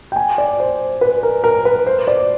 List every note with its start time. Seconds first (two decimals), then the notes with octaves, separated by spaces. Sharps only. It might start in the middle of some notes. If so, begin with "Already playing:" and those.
0.12 G5
0.16 G#5
0.38 D5
0.60 C5
1.01 B4
1.23 A#4
1.44 A#4
1.65 B4
1.87 C5
2.07 D5